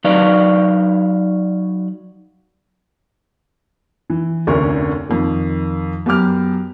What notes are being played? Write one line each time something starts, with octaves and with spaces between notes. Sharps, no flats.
F#3 D#4 B4 C#5 D5 F5
E3
F1 D2 D3 C#4 A#4 C#6
F2 D#3
F#2 B3 G4 D6 F6